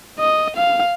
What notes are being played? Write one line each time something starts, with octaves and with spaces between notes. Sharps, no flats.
D#5
F5